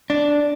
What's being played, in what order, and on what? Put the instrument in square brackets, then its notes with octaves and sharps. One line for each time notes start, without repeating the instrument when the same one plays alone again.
[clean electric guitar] D4